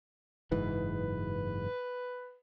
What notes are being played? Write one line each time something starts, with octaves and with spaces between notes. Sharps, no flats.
F#1 G#2 E3 B4